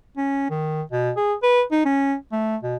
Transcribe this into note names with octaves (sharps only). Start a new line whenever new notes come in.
C#4
D#3
B2
G#4
B4
D#4
C#4
A3
B2